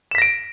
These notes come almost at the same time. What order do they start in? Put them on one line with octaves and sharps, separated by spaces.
E7 B6 A#6 D7